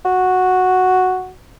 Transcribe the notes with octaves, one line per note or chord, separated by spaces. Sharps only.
F#4